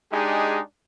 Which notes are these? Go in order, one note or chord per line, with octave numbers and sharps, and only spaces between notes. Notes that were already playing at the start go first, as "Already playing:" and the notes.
G#3 D4 D#4 G4 G#4